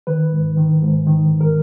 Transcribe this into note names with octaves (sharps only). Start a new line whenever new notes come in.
D#3 B4
G#2
D#3
G#2
D#3
G#2
A#4